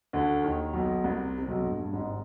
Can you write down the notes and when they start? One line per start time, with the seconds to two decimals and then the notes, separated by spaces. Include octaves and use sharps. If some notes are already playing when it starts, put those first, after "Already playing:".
0.13 D2 D3
0.43 D#2 D#3
0.73 B1 B2
1.04 C2 C3
1.38 C3
1.48 B1 B2
1.64 G2
1.78 G2
1.93 G#1 G#2
2.04 C3